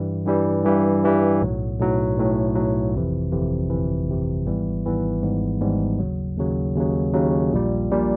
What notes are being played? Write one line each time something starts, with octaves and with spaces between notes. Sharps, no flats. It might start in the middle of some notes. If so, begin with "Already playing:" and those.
Already playing: G2 E3 G3
G2 E3 G3
G2 E3 G3
G2 E3 G3
B1 A2 F#3
B1 A2 F#3
B1 A2 F#3
B1 A2 F#3
G1 F2 C3 E3
G1 F2 C3 E3
G1 F2 C3 E3
G1 F2 C3 E3
G#1 G#2 E3 G3 B3
G#1 G#2 E3 G3 B3
G#1 G#2 E3 G3 B3
G#1 G#2 E3 G3 B3
D#2 C#3 F#3
D#2 C#3 F#3
D#2 C#3 F#3
D#2 C#3 F#3
A#1 A#2 G3
A#1 A#2 G3